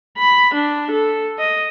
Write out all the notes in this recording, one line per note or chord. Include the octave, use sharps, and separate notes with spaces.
B5
D4
A4
D#5